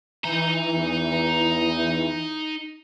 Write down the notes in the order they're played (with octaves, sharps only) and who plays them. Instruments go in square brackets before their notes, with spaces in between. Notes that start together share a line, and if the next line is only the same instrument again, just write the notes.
[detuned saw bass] E3 [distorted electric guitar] D#4 A#5
[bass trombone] E2